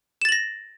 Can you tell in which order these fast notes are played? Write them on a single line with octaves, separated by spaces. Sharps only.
E7 A6 F#7 A#6